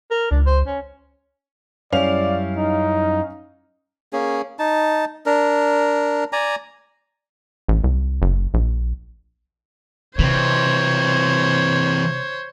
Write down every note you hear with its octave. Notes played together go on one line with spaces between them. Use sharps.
A#4
C#2 D4
C5
C#4
F#2 G3 C#4 E4 D5 F5 F7
D#4
A#3 C#4 G#4
D#4 A5
D4 A#4
D5 G#5 A#5
A1
C2
F#1
A#1
C3 E3 C4 C5 C#5